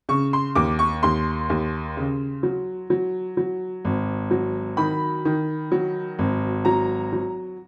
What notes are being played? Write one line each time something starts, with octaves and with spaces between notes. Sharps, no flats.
C#3 C#6
C6
D#2 D6
C#6
D#2 C6
D#2
C#3
F#3
F#3
F#3
G#1
F#3
D#3 B5
D#3
F#3
G#1
F#3 A#5
F#3